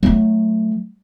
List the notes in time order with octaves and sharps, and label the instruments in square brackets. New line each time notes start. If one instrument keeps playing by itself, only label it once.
[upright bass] F#3 A3